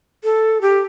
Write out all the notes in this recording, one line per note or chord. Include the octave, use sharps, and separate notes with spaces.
A4
G4